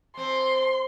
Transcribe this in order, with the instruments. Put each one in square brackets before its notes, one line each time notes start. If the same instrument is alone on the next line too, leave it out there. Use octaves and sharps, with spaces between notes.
[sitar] C4 [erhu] C6